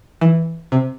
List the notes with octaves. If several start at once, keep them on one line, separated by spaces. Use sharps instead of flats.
E3
C3